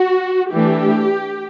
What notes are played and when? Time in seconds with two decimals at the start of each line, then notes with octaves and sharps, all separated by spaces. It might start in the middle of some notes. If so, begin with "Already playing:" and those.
Already playing: F#4
0.52 E3 A3 D4 G4